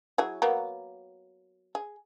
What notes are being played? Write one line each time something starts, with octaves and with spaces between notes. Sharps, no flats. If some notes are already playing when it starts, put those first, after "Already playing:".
F#3 E4 G#4
F#3 A#3 B3
G#4